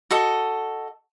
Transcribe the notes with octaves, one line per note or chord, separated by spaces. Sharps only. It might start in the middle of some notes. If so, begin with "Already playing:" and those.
F#4 A4 D#5